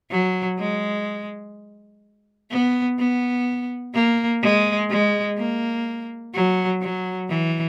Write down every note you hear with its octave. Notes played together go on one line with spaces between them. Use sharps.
F#3
G#3
B3
B3
A#3
G#3
G#3
A#3
F#3
F#3
E3